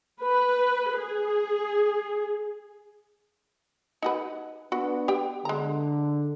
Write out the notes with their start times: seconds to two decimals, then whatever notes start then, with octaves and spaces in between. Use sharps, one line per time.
0.22 B4
0.97 G#4
4.02 D#4 F#4 B4
4.72 B3 D4 F#4 B4
5.08 G4 G5
5.45 D3 G#3 A#5